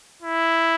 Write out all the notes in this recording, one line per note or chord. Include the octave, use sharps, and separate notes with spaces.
E4